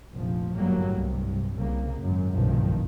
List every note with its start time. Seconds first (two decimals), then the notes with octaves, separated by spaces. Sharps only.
0.15 F1 A#1 F3
0.55 G1 F#2 A2 F#3 G3 A#3
0.93 C2 G2
1.56 C2 C#3 A#3
2.00 G#1 F#2
2.34 F#1 B1 G2 A#2 D#3 F3